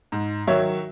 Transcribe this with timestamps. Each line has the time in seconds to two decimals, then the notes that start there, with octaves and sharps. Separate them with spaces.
0.12 G#2
0.47 D#3 F#3 C#5 E5